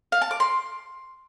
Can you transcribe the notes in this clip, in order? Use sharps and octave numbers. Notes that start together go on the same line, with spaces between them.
F5
A5
D6
C6